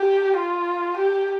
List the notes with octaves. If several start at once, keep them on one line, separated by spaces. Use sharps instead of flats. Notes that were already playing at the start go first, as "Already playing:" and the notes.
Already playing: G4
F4
G4